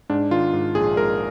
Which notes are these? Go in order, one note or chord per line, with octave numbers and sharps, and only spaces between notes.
G#2 D4
D#3 F4
G#2
A#1 G#4
G#2 A#4